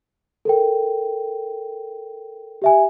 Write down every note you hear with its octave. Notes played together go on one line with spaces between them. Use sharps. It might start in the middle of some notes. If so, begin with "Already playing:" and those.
A4 A#4 G5
G4 E5 G#5